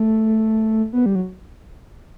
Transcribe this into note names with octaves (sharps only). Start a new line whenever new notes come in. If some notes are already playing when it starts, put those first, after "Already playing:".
Already playing: A3
B3
G3
F#3